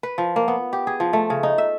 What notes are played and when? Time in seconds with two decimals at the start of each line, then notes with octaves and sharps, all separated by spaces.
0.03 B4
0.18 F3
0.36 A#3
0.48 B3
0.73 G4
0.87 G#4
1.00 F3
1.13 A3
1.30 C#3
1.43 D#4
1.58 E5